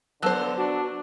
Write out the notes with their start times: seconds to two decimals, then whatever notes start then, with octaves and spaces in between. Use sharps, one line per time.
0.22 D3 F#3 B3 C5 A5 E6 F#6
0.57 D4 F#4